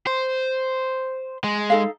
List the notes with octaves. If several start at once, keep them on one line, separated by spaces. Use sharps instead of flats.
C5
G#3
D#4 A4 F5